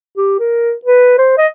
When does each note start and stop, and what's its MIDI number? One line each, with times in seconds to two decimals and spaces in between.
0.17 0.38 67
0.40 0.72 70
0.85 1.16 71
1.18 1.33 72
1.38 1.47 75